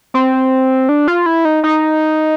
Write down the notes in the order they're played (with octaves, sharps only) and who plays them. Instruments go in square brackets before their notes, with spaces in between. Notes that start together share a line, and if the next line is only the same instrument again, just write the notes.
[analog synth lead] C4
D4
F4
E4
D#4
D#4